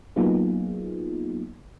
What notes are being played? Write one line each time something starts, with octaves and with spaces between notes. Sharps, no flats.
F#3 A#3 B3 D#4 F4 G#4